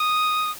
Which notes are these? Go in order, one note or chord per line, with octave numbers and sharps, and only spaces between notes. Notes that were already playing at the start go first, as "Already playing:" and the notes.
Already playing: D#6